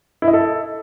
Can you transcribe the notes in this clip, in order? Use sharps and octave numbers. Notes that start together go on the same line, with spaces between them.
E4
D#5
A4